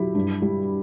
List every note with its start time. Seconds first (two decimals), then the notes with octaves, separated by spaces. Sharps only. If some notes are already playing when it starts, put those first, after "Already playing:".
Already playing: F#3 E4 G4
0.15 G2
0.42 G3